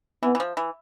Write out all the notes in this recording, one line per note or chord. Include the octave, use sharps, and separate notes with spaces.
E3 B3
E3
F3
E3